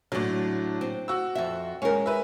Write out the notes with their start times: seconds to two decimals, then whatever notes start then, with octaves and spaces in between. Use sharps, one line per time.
0.12 A2 D3 F#3 D4
0.81 C4
1.08 F#4 E6
1.35 F2 E5
1.82 G#3 C#4 A#4
2.06 B4 E5